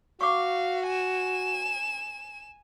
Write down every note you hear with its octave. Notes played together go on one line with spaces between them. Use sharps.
F#4 F5 C#6 D6
G#5 E7